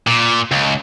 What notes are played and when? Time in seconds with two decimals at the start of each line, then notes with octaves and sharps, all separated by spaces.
0.07 A#2
0.51 C#2